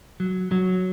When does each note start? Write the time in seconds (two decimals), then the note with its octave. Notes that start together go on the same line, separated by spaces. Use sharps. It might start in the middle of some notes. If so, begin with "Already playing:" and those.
0.20 F#3
0.52 F#3